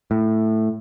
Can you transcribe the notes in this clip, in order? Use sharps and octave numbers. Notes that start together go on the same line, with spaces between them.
A2